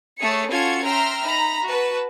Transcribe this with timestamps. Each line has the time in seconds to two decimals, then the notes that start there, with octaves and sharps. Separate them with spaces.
0.20 A3 G#4 C#5 C#7
0.49 C#4 F4 F#4 A4 G#6 C#7
0.85 E5 G5 A#5 C6 F6
1.25 D#4 A#5 B5
1.67 F#4 B4 A5